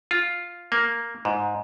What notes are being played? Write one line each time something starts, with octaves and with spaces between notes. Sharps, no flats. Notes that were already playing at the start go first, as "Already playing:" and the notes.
F4
A#3
G#2